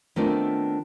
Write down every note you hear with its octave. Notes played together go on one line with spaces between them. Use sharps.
D#3 A3 B3 C4 D4 F4